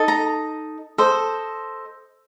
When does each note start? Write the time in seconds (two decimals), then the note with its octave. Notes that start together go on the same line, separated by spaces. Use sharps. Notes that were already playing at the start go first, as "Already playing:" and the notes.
Already playing: D#4 A4 D#5
0.08 A#5
0.98 A4 C5 D#5